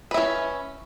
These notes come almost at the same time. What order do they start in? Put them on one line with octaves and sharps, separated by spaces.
B4 E4 C#4